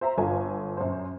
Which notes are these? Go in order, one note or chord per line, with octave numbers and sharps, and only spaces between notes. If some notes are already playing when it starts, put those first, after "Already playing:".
C5 E5 A#5
G1 F4 A4 G#5
F#2 C5